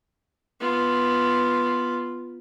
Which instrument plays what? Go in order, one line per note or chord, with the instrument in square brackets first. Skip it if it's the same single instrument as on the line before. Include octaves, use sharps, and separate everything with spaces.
[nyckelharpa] B3 F4